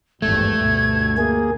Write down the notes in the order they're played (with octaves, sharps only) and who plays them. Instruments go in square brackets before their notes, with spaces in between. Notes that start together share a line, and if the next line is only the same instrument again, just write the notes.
[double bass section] G#1 E2 G2 [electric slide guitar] A3 [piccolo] G#6
[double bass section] D2 G2 B2
[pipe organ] A#3 G#4